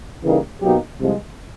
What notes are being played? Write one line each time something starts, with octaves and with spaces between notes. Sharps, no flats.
C#3 E3 G3 A#3 D#4
B2 F#3 A#3 D#4 G4
C2 C3 F3 G#3